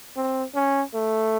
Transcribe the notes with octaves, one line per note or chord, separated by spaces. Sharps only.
C4
C#4
A3